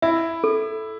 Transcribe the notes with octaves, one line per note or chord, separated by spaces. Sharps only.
E4 E5
A4